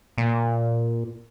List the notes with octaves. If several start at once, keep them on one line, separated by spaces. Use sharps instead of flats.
A#2